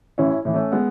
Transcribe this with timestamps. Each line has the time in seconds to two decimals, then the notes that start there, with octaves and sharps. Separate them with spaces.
0.18 A1 C#4 E4
0.45 A2 E3
0.54 A3 C#4
0.72 G#3 B3